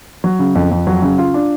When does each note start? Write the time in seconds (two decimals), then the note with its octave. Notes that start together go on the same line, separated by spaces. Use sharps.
0.24 F#3
0.39 C#3
0.55 F2
0.71 F2
0.87 F#3
1.02 C#3
1.18 F4
1.34 D4